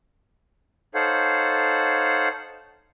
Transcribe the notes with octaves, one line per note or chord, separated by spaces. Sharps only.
D#4 A4 C5 C#5 F5 F#5